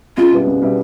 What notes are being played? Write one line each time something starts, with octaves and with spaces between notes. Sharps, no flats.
C#2 F4
B2 G3 B3 E4
C#2
B2 G3 B3 E4